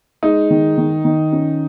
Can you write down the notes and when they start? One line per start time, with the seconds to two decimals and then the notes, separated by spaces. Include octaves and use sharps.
0.23 G#3 D#4
0.50 D#3
0.78 D#3
1.05 D#3
1.32 C#4